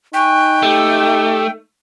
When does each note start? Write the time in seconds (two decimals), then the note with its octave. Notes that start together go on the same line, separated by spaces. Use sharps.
0.14 D#4 G5 G#5 C#6 F#6
0.63 A3 G4